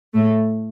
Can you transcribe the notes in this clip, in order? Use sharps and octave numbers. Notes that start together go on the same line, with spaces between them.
A2 A3